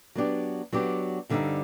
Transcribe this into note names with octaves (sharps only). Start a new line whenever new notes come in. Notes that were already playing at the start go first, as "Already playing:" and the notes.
F#3 B3 D4 G4
F#3 B3 D4 G4
G2 D3 G3 C4 D#4